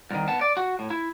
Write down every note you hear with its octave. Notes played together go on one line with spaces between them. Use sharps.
C2 D#3
B3 A5
D5
F#4
A2
E4